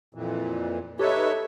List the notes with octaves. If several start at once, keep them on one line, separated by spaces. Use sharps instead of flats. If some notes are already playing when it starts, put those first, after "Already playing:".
F2 A#2 E3
D#4 G4 A4 B4 C#5 E5